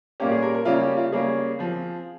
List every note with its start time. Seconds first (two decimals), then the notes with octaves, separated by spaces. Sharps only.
0.20 A#2 G3 A#3 C#4 G4
0.32 G#4
0.42 A#4
0.55 A#4
0.65 C#3 G3 A#3 C#4 F4
0.81 G4
0.97 F4
1.12 C#3 G3 A#3 C#4 G#4
1.59 F3 C4